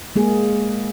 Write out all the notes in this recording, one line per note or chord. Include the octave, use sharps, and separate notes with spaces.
G#3 A#3 G#4